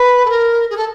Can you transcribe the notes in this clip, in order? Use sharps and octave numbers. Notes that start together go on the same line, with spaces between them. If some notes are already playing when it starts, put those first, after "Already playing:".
Already playing: B4
A4
A#4
G#4
A4